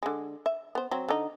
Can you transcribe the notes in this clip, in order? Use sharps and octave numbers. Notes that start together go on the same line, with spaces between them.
D3 G#3
E5
B3 C5
F#3 C4
D3 D#4